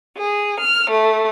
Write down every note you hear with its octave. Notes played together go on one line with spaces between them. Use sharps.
G#4
F6
A3